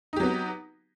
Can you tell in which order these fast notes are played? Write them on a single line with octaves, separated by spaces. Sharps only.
D#4 G4 F#3 B3